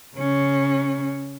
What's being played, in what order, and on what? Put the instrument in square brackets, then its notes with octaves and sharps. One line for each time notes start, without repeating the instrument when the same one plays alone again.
[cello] C#3 C#4